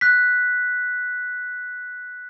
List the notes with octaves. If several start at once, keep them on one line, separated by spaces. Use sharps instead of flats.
F#6 B6